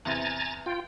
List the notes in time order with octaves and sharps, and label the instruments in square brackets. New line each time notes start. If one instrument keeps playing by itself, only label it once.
[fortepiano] E2 C3 [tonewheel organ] G#5 A#5 A6
[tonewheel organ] F4 G5